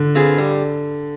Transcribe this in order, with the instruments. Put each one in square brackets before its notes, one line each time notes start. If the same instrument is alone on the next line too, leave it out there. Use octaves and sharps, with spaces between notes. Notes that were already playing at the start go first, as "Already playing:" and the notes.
Already playing: [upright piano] D3
[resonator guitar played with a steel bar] C4 F4 G#4 B4
G3